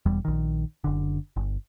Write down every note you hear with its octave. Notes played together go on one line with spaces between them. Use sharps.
E1 E2 G3
A#1 D#3
F#1 D3
G1